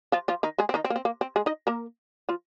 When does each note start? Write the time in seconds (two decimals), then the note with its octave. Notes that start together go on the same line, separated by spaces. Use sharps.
0.12 F3 F4
0.28 F3 F4
0.43 D#3 D#4
0.58 G#3 G#4
0.69 C4
0.74 D#3 D#4
0.84 C4
0.90 A#3
0.96 C4
1.05 A#3
1.21 C4
1.36 G#3 G#4
1.46 D#4 D#5
1.67 A#3 A#4
2.29 F3 F4